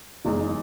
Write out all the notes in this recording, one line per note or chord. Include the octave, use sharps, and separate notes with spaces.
F#1 E2 C#3 G#3 D#4